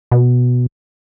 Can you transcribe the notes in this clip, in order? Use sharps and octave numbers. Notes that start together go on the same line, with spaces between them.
B2